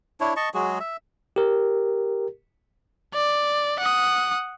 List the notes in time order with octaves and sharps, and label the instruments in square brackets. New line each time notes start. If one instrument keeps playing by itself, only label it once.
[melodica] D4 E4 C#5
D#5 A5 C#6
F#3 G#3 F#4 G#4
E5
[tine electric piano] G4 A#4
[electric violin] D5
F#5 D#6